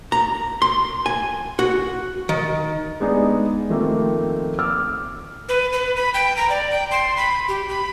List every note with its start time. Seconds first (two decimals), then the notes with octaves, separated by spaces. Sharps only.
0.12 A#5
0.62 C6
1.06 G#5
1.59 F#4
2.29 D#3
3.00 G#3 B3 D4 D#4 G#4
3.69 D#3 F3 A3 A#3 C4
4.59 D6 E6 F6
5.49 B4
5.73 B4
5.96 B5
6.14 G5
6.37 A#5
6.50 D5
6.71 G5
6.91 C6
7.17 B5
7.48 G4
7.69 B5